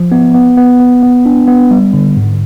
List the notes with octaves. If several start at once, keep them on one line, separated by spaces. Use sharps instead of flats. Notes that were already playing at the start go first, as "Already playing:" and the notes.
Already playing: F3
B3
B3
B3
B3
B3
D4
B3
G3
D3
G#2